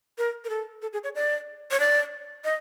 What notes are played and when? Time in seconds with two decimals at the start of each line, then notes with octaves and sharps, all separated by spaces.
0.18 A#4
0.44 A#4
0.50 A4
0.82 A4
0.93 G#4
1.04 C#5
1.15 D5
1.71 C#5
1.80 D5
2.44 D#5